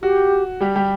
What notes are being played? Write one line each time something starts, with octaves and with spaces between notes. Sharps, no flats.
F#4 G4
G3 G4
G3 G4